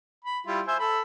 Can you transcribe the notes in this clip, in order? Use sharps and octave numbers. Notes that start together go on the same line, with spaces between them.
B5
G3 E4 F4
C5 E5 G#5
A4 B5